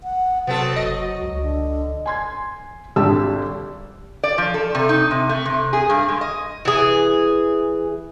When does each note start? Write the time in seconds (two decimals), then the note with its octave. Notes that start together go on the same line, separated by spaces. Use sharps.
0.03 F#5
0.47 C3 F#3 B3 C4 A4
0.76 F#1 D#5
1.21 C#2
1.42 D3
2.06 G#5 C6 G#6
2.96 G#1 D3 G3 G4 A5 E6
4.23 D5
4.38 F3
4.54 A4
4.75 C3
4.89 D#4
5.11 C3
5.29 A3
5.45 C3
5.73 G#4
5.90 G2
6.08 G#3
6.21 D#5
6.65 E3 G#4